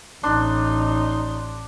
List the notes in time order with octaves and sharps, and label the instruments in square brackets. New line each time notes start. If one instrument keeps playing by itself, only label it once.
[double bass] A1 [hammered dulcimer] D4 [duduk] D#4 [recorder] C6